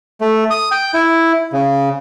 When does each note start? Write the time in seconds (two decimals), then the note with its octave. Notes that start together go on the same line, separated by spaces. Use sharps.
0.21 A3
0.50 D#6
0.71 G5
0.94 E4
1.53 C#3